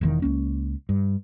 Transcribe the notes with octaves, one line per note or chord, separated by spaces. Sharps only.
E1 E2 D#3
C#2 A#3 C#4
G2